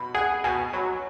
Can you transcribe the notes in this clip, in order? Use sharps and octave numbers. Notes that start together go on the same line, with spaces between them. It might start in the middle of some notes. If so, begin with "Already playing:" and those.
Already playing: B2 B5
G#4 F#5
B2 G#5
F#3 B5